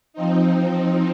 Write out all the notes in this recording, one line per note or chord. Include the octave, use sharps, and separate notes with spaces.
F3 C4 D#4